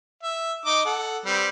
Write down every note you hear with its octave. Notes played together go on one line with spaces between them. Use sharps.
E5
D#4 D#5 D6
A4 F#5
G3 C4 B4